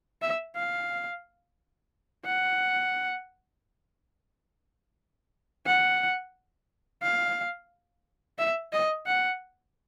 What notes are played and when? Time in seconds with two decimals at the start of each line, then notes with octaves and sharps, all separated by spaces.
0.22 E5
0.56 F5
2.26 F#5
5.66 F#5
7.03 F5
8.39 E5
8.73 D#5
9.07 F#5